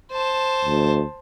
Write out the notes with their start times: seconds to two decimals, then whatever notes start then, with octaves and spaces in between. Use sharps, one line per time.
0.11 C5 A5
0.65 D2